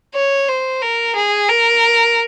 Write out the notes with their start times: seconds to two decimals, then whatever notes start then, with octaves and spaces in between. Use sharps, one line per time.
0.15 C#5
0.48 C5
0.82 A#4
1.15 G#4
1.49 A#4